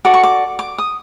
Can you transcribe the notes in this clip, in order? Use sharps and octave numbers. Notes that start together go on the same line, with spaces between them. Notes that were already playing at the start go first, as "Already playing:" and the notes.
F#4 A4 D5 D6
C#6
D6
D6
D#6